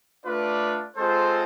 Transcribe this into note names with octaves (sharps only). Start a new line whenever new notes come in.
A3 D4 F4 B4 D5
G#3 C4 F4 A4 C5